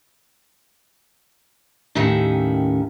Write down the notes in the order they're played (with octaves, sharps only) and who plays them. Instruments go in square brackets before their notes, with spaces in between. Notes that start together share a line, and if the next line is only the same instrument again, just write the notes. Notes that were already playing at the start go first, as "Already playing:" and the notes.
[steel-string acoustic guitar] D#2 A2 D#3 C#4 E5